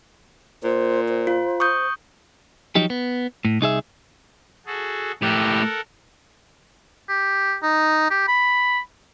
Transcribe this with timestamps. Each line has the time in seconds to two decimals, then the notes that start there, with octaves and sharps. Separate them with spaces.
0.64 A#2 C5
1.09 C5
1.27 F4
1.60 C#6 D#6 G6
2.75 F3 F#3 D#4 G4
2.90 B3
3.45 A2
3.61 C2 D#4 G#4 E5
4.66 F#4 G#4 A4
5.22 A2 G4 A4 A#4 F#5
7.09 G4
7.63 D#4
8.10 G4
8.28 B5